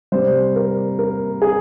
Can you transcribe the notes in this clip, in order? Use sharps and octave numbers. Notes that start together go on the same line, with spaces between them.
C3 G3 C5
A#4
A#4
G#4